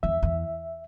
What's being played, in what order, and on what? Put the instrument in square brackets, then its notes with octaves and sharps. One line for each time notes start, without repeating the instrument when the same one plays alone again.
[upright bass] E2 [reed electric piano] E5
[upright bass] E2